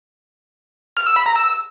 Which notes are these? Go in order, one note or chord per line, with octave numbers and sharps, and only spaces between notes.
F6
E6
B5
A#5
E6